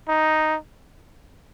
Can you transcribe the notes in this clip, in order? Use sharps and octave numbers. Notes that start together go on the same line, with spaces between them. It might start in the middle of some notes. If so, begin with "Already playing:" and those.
D#4